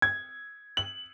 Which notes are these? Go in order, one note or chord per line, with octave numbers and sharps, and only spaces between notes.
G#6
F#7